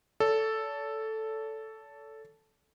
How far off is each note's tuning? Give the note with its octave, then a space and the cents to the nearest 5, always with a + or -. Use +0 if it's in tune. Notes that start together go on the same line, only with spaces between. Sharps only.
A4 +0 C#5 +45